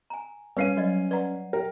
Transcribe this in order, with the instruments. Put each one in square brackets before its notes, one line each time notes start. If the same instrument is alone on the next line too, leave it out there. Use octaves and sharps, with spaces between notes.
[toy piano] G#5 A#5
[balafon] G3 [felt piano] C#4 C7 D#7 [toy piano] B4 F5
[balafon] F#3 [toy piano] F#4 D5 D#5
[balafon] B4 A#5 [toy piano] D5 F#5
[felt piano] A#4 [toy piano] G5